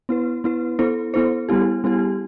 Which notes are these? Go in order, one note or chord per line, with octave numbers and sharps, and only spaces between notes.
B3 E4 B4
B3 E4 B4
B3 E4 A4 C5
B3 E4 A4 C5
G3 B3 E4 G4
G3 B3 E4 G4